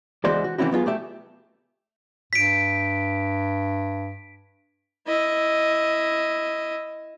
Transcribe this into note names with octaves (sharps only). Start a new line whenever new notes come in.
C#2 E3 G#3 F#4 C5 D5
F#4
E3 A#3 C4 C#4 E4 F#4
F#3 B3 D#4 F4 G#4
A3 G4 E5
G2 B6 D7
E4 D#5